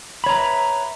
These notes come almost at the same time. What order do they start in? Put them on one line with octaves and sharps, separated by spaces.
B5 C#5 A#5 B4 E5